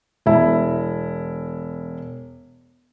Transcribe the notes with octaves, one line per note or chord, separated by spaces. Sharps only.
E1 E4